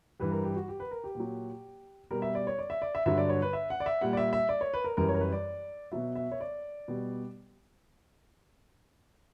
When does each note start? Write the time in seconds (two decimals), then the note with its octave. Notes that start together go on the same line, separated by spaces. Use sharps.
0.20 G2 E3 G3 B4
0.32 A#4
0.44 G4
0.56 F#4
0.68 G4
0.80 B4
0.91 A#4
1.04 G4
1.15 A#2 F#3
2.11 B2 G3 A#4
2.22 E5
2.35 D5
2.47 C#5
2.59 D5
2.70 E5
2.82 D5
2.95 E5
3.06 G2 D3 F#3 E5
3.18 D5
3.29 C#5
3.42 B4
3.53 E5
3.70 F#5
3.80 D5
3.86 E5
4.01 A#2 G3 F#5
4.13 D5
4.17 E5
4.33 E5
4.49 D5
4.61 C#5
4.74 B4
4.84 A#4
4.97 F#2 E3 G3 A#4
5.09 C#5
5.15 A#4
5.21 B4
5.32 D5
5.92 B2 F#3 E5
6.15 E5
6.32 C#5
6.41 D5
6.88 B2 G3